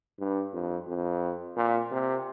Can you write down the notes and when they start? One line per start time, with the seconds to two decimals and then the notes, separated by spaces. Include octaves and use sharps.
0.19 G2
0.54 F2
0.88 F2
1.57 A#2
1.92 C3